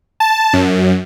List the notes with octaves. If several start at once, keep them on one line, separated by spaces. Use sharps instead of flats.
A5
F#2